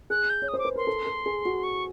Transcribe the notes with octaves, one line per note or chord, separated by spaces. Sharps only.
G#4 F#6
G6
C#5
D#6
C5
D6
B4
A#4 C6
A4
A4
G#4
F#4
C#6